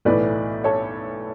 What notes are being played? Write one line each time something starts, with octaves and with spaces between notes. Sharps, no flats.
B1 A2 E3 A3 B4 D5
A4 C#5